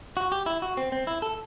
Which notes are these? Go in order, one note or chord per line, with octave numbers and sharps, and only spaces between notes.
F#4
G4
E4
F#4
C4
C4
E4
A4